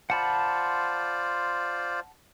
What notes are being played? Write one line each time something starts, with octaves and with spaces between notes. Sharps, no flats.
F4 C5 D5 F#5 A5 B5